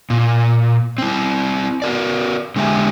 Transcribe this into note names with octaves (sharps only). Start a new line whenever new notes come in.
A#2
C4 E4
F#4 A#4 D5
D3 G#3 G4 E5 G#5